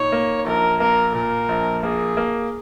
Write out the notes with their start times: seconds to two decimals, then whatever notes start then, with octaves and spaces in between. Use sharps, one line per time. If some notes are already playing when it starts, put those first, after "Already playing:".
Already playing: A#2 D#4 C#5
0.12 A#3
0.46 A#1 A#4
0.80 A#3 A#4
1.14 A#2 A#4
1.49 A#1
1.82 A#3 G#4
2.17 A#3